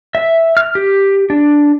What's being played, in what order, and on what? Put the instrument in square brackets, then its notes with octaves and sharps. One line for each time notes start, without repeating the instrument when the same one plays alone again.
[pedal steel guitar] E5
F6
G4
D4